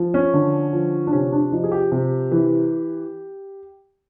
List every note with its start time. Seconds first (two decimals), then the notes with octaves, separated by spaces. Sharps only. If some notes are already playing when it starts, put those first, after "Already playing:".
Already playing: F3
0.14 C#4
0.33 D3
0.73 F3
1.07 D4
1.12 C3 C#4
1.32 D4
1.52 F3 D#4
1.64 G#4
1.72 G4
1.92 C3
2.31 E3